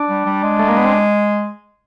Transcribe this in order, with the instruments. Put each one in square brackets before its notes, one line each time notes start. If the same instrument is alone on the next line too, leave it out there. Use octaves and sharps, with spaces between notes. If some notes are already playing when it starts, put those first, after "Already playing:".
Already playing: [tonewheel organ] D4
[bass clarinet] G3
G3
G#3
[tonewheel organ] A3
A#3
B3
C4